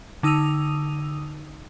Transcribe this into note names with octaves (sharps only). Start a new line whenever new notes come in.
D3 D#4 D#6 E6 D#7 F7